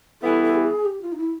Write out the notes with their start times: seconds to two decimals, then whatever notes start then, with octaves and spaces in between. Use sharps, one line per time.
0.22 E3 G3 B3 E4 A4
0.44 A4
0.55 G4
0.65 G#4
0.85 G4
1.02 F4
1.12 D#4
1.18 E4